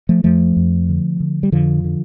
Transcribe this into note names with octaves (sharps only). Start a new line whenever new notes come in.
F3 A3
F2 F3 A3
F2
D3
D3
G3
F2 D3 F3
D3